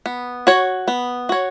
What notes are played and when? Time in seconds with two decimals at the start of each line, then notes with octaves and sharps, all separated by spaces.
0.06 B3
0.47 F#4 C#5
0.88 B3
1.29 F#4 C#5